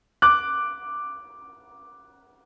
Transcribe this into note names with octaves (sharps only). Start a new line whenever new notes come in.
D6 F#6